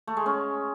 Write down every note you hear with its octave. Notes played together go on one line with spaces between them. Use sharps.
A3
G#3
C#4